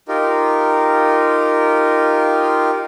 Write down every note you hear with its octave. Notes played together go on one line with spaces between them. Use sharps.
D#4 F4 G4 A#4